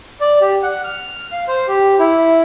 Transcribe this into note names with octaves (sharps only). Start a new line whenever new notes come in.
D5
G4
F#5
F6
F5
C5
G4
E4